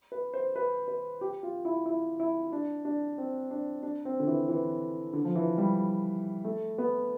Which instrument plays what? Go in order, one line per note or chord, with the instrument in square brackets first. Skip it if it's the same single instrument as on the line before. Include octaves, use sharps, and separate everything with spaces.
[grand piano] B4
C5
B4
B4
G4
F4
E4
E4
E4
D4
D4
C4
D4
D4
C4
D3
E3
E3
D3
F3
E3
G3
A3
B3